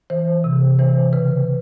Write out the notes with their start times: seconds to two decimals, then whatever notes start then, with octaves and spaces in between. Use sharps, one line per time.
0.10 E3 C5
0.44 C3
0.79 E3 C5
1.13 C#3 B4